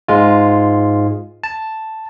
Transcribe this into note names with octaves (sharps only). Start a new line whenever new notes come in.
G#2 G#3 F4
A5